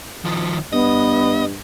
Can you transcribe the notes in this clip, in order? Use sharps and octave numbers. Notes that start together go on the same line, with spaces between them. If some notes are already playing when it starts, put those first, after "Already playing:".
D#3 F3
G2 B3 D#5